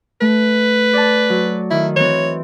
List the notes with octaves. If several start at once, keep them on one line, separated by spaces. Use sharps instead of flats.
A3 B4
D5 A5
F#3
D#3 E4
E3 C4 C#5